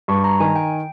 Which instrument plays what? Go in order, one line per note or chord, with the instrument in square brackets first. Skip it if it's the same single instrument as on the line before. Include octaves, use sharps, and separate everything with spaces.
[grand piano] G2 [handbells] C#6
[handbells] A#5
[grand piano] D#3 [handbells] G#5
[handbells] G5